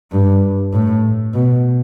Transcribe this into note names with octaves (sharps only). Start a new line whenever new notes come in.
G2
A2
B2